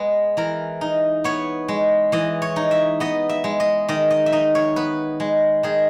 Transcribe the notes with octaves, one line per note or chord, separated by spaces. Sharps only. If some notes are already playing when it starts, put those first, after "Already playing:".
Already playing: G#3 B3 B4
E3 A#4
D#4
B3 C#5
G#3
E3 D#5
C#5
D#4
E5
B3 D#5
E5
G#3
D#5
D#3 D#5
D#5
E5
D#4 D#5
C#5
B3 B4
G#3
D#3 G#4